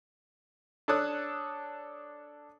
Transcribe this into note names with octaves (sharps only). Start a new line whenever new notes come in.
D4 A4 C#5 A5 D#6 F#6